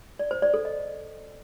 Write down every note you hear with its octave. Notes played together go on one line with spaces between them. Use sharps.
D5
C5
D5
A4
D#5